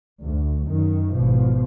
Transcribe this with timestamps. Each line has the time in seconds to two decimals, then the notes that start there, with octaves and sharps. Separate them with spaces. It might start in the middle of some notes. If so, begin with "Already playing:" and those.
0.22 D2
0.66 F#2 D#3
1.13 G#1 B2 F3